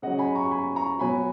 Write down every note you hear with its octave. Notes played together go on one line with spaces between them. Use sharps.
C#3 F#3 D#5 F#5
G#5 B5
A#5 C#6
G#5 B5
A#5 C#6
B2 F#3 G#5 B5